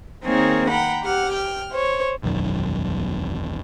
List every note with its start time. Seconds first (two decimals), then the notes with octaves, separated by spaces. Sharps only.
0.25 D#3 A#3 C4 D#4 G#4 C#5
0.69 F#5 G5 A#5 B5
1.03 G4 F#5 F6
1.32 G5 F6
1.72 C5 C#5
2.23 E1 B1 F#2 D#3